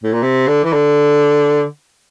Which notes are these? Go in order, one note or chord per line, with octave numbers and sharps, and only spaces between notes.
A2
A#2
C3
D3
E3
D3